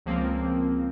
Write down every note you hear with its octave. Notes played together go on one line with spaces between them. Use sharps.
C#2 F3 A#3 C4